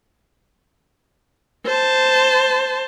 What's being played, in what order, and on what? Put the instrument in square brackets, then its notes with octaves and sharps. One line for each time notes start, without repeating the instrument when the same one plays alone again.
[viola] C5 A5